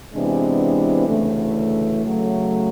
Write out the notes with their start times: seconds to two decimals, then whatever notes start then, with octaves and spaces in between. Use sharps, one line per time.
0.14 C3 E3 G#3 B3 D4
1.07 D2 C#3 E3 A3
2.02 C#3 F#3 A3